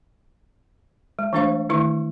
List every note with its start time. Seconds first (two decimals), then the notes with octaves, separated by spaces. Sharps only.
1.19 G#3
1.33 E3 A3 D4 C5 F5 C#6
1.69 D#3 A3 E4 C#6